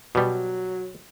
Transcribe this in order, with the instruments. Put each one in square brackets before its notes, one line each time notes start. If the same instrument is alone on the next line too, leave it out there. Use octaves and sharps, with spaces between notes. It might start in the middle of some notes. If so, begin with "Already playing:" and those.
[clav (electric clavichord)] B2 G3 [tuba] F#3